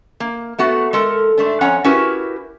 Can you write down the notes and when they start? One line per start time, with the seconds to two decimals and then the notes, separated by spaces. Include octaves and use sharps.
0.20 A#3
0.59 A3 B3 F#4 F#5
0.93 G#3 A4 A#4
1.37 G#2 A3 D4
1.61 F2 C#4 C#5 F#5 G#5 A#5
1.84 C#4 E4 F#4 G4 A#4 B4